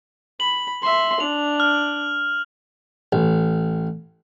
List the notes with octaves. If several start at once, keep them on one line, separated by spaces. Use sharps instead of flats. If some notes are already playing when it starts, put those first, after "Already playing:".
B5 F#7
E5 C6
D4 F7
F6
A1